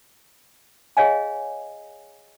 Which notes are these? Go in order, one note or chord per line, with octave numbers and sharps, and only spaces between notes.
G#4 C#5 D#5 F5 G#5